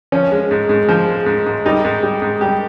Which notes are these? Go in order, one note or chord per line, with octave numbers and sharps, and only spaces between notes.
F3 C#4
G#3
G#2
G#2
F3
G#3
G#2
G#2
G3 D#4
G#2
G3
G#2
G3 G4